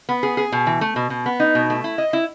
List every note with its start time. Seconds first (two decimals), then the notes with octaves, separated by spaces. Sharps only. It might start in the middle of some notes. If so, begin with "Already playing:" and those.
0.09 B3
0.23 G#4
0.37 G#4
0.52 B2
0.67 E3
0.81 A3
0.96 B2
1.10 B2
1.26 B3
1.40 D#4
1.55 B2
1.70 A3
1.84 E4
1.98 D#5
2.13 E4